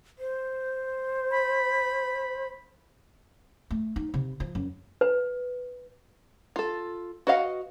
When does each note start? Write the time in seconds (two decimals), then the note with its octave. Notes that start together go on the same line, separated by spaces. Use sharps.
0.19 C5
1.31 B5
3.71 A3
3.96 D#4
4.14 C3
4.40 F3
4.55 F#2
5.01 B4
6.56 F4 A4
7.27 F#4 B4 D#5 F5 F#5